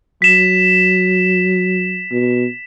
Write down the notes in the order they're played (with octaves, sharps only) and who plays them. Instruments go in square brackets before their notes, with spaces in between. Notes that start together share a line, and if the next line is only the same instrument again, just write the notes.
[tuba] F#3 [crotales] B6 E7
[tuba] B2